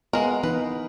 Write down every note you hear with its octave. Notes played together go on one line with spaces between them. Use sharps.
G#3 B3 A#4 F5 F#5
E3 B3 D#4 B4